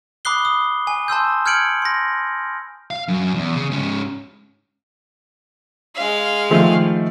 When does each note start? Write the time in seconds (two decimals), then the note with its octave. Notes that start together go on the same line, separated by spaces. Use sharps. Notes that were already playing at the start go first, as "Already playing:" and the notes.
0.25 B5 D6 D#6 F#6 C7 G7
0.45 D#6
0.87 G#5
1.08 A5 C6 E6 G6
1.46 F6 G6 G#6 C#7 D7 F#7
1.82 C6 A#6
2.91 F5
3.08 F#2
3.34 E2
3.55 C#3
3.71 G#2 C#4
5.96 G#3 F5
6.50 D#3 F3 A3